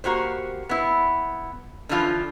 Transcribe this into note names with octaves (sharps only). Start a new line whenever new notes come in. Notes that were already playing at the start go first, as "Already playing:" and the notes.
A#3 F#4 G4 C5
B3 E4
D3 E3 F3 F4